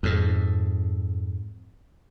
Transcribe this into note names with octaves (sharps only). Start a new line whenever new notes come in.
F2 G#2